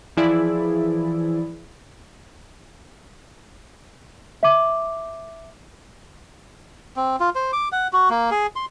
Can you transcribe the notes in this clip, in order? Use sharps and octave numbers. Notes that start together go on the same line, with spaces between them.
E3 F3 E4 G#4 D5
E5 D6
C4
F4
C5
D6
F#5
F#4
A#3
G#4
C6